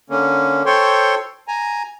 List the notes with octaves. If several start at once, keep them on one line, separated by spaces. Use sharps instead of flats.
D3 A#3 C#4
A4 C5 C#5 G5 C6 C#6
G#5 A#5